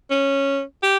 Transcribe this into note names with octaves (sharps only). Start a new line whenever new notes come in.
C#4
G4